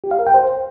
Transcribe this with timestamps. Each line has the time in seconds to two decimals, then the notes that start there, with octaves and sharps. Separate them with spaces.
0.04 G4
0.11 F5
0.19 A#4
0.27 G5
0.34 C5